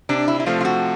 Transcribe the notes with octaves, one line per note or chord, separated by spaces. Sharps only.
C3 D4
E4
E4
F3 A3 C4 F4
F4
F#4